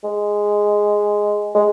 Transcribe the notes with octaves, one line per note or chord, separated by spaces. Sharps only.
G#3
G#3